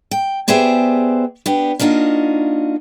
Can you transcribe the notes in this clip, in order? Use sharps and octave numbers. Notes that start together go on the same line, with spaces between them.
G5
B3 G4 G#4 C5 D5 E5
B3 D4 G4
A#3 D4 D#4 F4 F#4